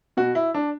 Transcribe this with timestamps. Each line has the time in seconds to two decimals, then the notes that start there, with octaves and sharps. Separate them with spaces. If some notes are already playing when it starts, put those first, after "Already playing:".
0.17 B2 F#4
0.35 E4
0.54 D4